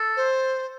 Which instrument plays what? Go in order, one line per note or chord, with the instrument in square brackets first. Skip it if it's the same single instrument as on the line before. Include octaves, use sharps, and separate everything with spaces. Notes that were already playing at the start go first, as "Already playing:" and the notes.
Already playing: [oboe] A4
[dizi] C5